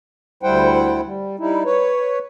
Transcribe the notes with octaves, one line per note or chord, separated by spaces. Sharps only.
D2 G3 E4 C5 F#5 G5
G3
G3 D#4 E4
B4 C#5